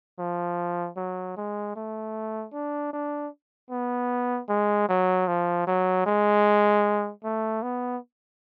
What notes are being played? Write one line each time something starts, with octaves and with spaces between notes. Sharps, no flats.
F3
F#3
G#3
A3
D4
D4
B3
G#3
F#3
F3
F#3
G#3
A3
B3